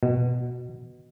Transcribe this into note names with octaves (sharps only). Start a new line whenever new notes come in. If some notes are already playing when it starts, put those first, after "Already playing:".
B2